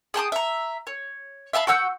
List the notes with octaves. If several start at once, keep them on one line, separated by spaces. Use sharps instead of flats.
G#4 G5 A5 D#6
E5 A#5
C#5
E5 F5 A5 B5
F#4 F#5 E6 G6